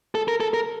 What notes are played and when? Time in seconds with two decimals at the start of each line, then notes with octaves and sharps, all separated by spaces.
0.15 A4
0.28 A#4
0.40 A4
0.54 A#4